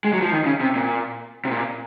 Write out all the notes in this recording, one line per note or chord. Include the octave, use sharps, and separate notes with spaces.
G#3
F#3
F3
D#3
C#3
C3
A#2
C3
A#2